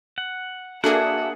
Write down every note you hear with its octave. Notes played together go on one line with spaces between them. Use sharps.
F#5
A#3 D4 F#4 G#4 A4 E5 F#5